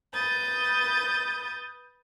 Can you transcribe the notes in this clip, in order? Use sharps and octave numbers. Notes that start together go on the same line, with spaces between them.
B4 D#6 G6 A6